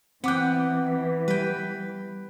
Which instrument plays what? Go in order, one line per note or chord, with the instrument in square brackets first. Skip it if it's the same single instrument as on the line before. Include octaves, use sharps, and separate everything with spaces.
[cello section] E3 [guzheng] B3 G5 [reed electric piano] C4 D6 F#6
[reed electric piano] G3 [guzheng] B4 G5